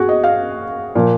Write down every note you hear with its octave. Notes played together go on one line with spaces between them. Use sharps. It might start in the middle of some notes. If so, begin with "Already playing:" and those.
Already playing: F#4 G#4
D#5
F5
A#2 F3